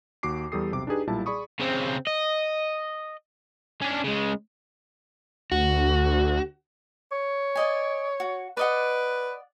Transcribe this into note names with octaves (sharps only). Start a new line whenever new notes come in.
D#2 F#4 D6 C7
E2 G3 G4 A4 D#6 C7
B1 C3 D6
D4 D#4 G4 G#4 B4
B1 A#2 G3 E4 A5
G#4 D5 B5 C#6 D#6
C#3 C4
D#5
C#4 D4
C#3 G#3
D2 F#4
C#5
D5 D#5 G#5
F#4
B4 D5 D#5 F#5